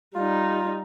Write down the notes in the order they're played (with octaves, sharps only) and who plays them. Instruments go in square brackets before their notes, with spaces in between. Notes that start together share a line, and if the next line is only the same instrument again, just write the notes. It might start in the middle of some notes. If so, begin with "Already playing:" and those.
[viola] G3 D#4 [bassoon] F4